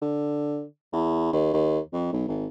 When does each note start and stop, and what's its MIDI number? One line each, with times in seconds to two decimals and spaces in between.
0.02 0.63 50
0.93 1.32 40
1.33 1.52 39
1.53 1.79 39
1.93 2.11 41
2.12 2.24 35
2.28 2.47 32